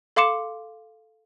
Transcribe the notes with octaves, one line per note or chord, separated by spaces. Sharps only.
A4 F5 C6 D6 C#7 E7